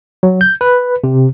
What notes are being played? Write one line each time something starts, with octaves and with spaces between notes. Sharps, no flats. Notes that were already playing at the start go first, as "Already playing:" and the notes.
F#3
G6
B4
C3